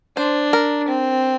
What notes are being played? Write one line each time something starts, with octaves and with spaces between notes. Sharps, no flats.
D4 C5
A#4
C4